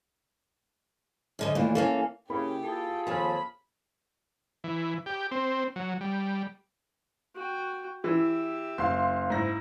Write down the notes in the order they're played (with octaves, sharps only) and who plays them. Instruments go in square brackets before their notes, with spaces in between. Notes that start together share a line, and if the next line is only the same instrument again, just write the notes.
[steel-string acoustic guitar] F#2 D3 D#5
[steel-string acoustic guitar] D#2 [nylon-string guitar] A#2 E3 A3
[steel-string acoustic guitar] E3 A#3 C#4 [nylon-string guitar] A4
[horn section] C#3 [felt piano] A#3 E4 B5 [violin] G4 G5
[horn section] F4 G#4 A4
[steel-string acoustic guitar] D#2 F3 C4 [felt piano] G#5 A5 F6 [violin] B5
[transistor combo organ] E3
G4
C4
F#3
G3
[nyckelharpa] F#4 G5
[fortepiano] E3 [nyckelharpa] G4 E5
[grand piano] F#1 [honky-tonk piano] F5 C6
[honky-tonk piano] G#2 A#6 [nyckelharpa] E4